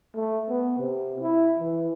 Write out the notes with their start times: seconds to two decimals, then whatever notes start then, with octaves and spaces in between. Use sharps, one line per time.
0.15 A3
0.49 B3
0.79 C3
1.21 E4
1.60 E3